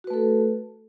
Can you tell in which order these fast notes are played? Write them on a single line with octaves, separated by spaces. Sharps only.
F#4 B4 A3 A4